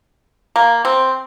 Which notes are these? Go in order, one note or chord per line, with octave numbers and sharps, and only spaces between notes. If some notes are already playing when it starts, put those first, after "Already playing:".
A#3
C4